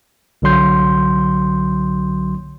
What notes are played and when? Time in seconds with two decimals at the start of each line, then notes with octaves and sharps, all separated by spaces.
0.42 C2 D3 F#3 C6 G6